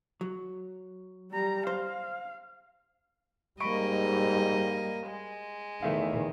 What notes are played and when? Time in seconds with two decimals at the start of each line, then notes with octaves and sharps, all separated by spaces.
0.21 F#3
1.31 G3 A#5
1.67 C5 F5
3.60 G#2 G3 A#3 D#5 B5 C#6 D7
5.06 G#3
5.82 E2 D#3 A3 E5 F5